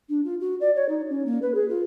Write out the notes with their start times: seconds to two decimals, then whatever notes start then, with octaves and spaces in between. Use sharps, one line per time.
0.09 D4
0.24 F4
0.40 F#4
0.60 D5
0.75 C#5
0.88 D#4
1.09 C#4
1.26 A#3
1.42 B4
1.54 G#4
1.68 F4